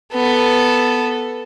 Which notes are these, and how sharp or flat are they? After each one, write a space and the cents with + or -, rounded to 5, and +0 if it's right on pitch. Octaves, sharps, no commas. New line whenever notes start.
B3 +0 A4 +0